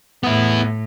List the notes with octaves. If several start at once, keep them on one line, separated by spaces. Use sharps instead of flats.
A2 B3 E4